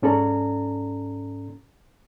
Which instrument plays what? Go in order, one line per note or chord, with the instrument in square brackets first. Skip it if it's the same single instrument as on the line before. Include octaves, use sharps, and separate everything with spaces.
[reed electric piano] G#2 C#4 A4 D5 A#5